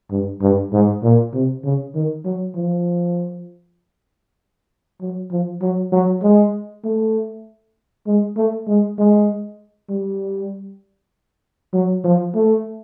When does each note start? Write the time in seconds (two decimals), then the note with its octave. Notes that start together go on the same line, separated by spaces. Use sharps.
0.11 G2
0.42 G2
0.73 G#2
1.03 A#2
1.34 C3
1.64 C#3
1.95 D#3
2.25 F#3
2.55 F3
5.01 F#3
5.31 F3
5.62 F#3
5.92 F#3
6.23 G#3
6.84 A3
8.07 G#3
8.37 A3
8.68 G#3
8.99 G#3
9.90 G3
11.73 F#3
12.04 F3
12.35 A3